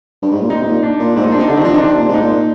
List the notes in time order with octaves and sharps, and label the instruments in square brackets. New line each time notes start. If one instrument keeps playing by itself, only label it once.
[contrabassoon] G2
G#2
A#2
[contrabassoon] C3 [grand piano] D#4
[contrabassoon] G#2
A#2
[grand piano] D4
[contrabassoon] A#2
[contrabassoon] G#2 [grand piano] C4
[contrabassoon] A#2 [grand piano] D#4
[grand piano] D4
[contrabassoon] C3
[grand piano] D#4
[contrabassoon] D3 [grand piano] D4
[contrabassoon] D#3 [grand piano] C4
[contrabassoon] F3 [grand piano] D4
[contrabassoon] D#3 [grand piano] D#4
[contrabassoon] C3 [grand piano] D4
[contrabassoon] A#2
G#2
[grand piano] D#4
[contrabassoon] A#2